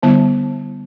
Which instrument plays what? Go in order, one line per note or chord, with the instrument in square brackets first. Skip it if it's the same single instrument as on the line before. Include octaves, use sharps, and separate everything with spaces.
[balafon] D3 G3 B3 E4